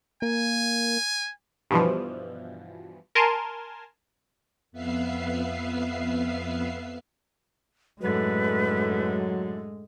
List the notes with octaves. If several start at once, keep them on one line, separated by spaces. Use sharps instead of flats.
A#3 G#5
G2 B2 E3 F3
A#4 G#5 A5 C6
F2 B3 B4 E5 F5 C7
F#2 A2 D3 F#3 G#3 B4